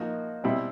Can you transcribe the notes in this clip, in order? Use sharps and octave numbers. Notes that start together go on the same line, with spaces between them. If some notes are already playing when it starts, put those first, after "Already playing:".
Already playing: F3 A#3 D#4 F#4
B2 G3 C4 E4